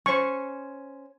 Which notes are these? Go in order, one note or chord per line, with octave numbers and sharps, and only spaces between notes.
C#4 C5 C#6